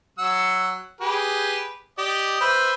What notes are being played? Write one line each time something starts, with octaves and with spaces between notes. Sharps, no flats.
F#3 F#5 E6
G4 G#4 B4
G4 D5 D#5
B4 C5 E5